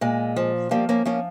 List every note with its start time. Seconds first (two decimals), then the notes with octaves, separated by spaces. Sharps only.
0.01 A#2 G#3
0.36 F3
0.71 F3 G3 A#3
0.89 A#3 C#4
1.05 F3 A#3 C#4